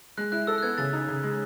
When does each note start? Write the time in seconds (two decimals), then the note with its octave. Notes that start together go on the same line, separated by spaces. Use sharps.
0.18 G#3 F#6
0.32 E4 F#6
0.47 A4 E6
0.58 F#6
0.63 B3 G#6
0.78 C#3 A6
0.93 D#4
1.08 C#3
1.23 G#3